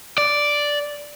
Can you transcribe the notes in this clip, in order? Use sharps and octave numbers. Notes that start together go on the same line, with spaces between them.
D5